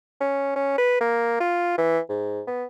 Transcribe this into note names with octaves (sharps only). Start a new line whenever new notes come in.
C#4
C#4
B4
A#3
F4
E3
G#2
B3